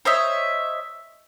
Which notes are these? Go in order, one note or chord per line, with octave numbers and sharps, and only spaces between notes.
C5 C#5 D#5 E5